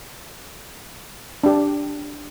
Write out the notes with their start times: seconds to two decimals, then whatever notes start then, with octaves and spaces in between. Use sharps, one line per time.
1.44 D4 G4